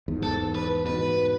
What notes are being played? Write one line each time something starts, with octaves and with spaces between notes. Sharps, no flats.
E2 G#2
A4
B4
G#2 B2 B4